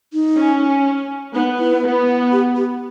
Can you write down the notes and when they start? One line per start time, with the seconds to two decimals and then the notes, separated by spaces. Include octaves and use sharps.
0.13 D#4
0.37 C#4
1.35 B3 D#4
1.59 E4
1.84 B3
2.32 G4
2.56 G4